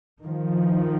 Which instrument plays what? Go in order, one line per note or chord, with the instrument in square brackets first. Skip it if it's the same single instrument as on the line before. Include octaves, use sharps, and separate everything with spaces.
[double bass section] D#3 F3